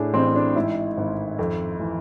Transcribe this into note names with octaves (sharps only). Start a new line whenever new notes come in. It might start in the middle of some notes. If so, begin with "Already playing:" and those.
Already playing: A2 D4 G#4
A1 C4
D4
G#2 E4
G#1
F2
E3